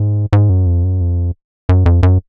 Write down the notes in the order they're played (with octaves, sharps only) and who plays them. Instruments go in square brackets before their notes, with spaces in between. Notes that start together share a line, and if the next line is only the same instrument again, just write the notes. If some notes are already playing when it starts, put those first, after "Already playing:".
Already playing: [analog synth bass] G#2
G#2
F#2
F2
F#2
F2
F#2
F2
F#2